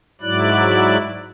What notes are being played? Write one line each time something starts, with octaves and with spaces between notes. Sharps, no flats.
G#2 F#3 E4 D5 F#6